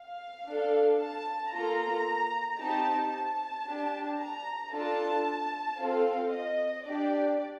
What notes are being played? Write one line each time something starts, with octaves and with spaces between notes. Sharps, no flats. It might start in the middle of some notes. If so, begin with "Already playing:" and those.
Already playing: F5
D4 A4
A5
A#3 F4 A4 A#5
C4 D#4 G4 A5
A5
D4 G4
A#5
D4 F4 A4 A5
C4 F4 A4 F5
D#5
D4 G4 D5